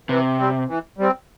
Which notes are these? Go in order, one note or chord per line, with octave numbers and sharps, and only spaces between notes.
C3 E3
G3 C4
E3
G3 C4